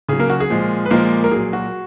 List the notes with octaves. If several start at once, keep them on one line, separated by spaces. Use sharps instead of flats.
C#3 F#3 G#4
A#3 A#4
F#4
G#4
A#2 F3 G#3
B4
A#2 F3 G#3 A#3 A#4
A#4
A#2 F#3 G#4
F#4